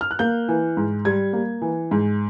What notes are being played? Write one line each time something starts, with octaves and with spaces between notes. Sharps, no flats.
F6
F#6
A#3 G6
E3
G#2
G3 G#6
A#3
E3
G#2